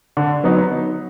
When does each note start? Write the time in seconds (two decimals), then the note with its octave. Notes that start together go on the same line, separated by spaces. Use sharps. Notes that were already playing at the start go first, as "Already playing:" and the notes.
0.17 D3
0.43 F#3 B3 D#4